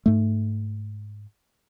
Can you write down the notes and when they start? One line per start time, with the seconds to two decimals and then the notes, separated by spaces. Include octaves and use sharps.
0.06 G#2 A3